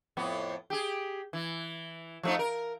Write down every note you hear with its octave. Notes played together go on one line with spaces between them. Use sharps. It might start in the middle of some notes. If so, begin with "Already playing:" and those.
F2 A2 B3
G4 G#4
E3
F3 A3 D#4
A#4